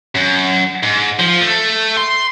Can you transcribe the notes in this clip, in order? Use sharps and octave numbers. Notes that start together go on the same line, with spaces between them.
F#2
G#2
F3
A3
C6